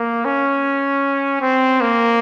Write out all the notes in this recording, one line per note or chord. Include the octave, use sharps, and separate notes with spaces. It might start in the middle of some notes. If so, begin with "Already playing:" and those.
Already playing: A#3
C#4
C4
A#3